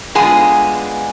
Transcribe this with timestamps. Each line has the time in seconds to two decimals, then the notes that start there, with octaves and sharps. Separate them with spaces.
0.15 D3 G#3 B3 F4 G#4 G#5